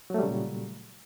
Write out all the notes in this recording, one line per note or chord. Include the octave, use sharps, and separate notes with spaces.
A#2 C#3 F#3 G3 A3